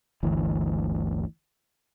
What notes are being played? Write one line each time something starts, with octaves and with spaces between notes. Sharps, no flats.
G1 D2 E3